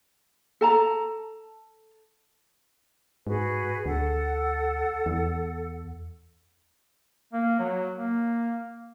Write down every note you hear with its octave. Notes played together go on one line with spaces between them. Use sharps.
A4 A5 A#5
G#2 F#4 G#4 B4
D2 A4 F#5
E2
A#3
F#3
A#3